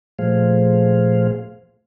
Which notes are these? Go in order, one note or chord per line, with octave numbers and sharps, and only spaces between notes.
A#2 F3 A3 G#4 C5 F5